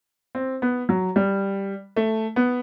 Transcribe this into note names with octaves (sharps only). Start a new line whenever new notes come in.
C4
B3
F#3
G3
A3
B3